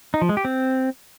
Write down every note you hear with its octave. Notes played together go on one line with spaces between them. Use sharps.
D#4
F3
G#3
G4
C4